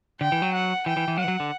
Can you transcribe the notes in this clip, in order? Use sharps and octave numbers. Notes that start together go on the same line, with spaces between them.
D3 G5
E3
F#3
F#5
E3 G5
E3
E3
F#3 F#5
E3
F#3
D3